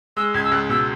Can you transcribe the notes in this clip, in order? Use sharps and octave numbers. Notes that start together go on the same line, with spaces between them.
G#3 E6
C#2 G#6
E6
C#2 F#6
B2 E6